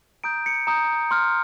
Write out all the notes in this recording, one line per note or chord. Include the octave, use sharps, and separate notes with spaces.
A#5 D#6 G6 D7
C#7
A#5 D#6 G6
C6 F6